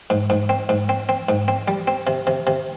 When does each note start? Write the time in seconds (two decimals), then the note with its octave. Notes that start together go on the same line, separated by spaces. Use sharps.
0.10 G#2
0.30 G#2
0.49 C4
0.69 G#2
0.89 C4
1.09 C4
1.29 G#2
1.48 C4
1.68 G3
1.87 C4
2.07 C3
2.27 C3
2.47 C3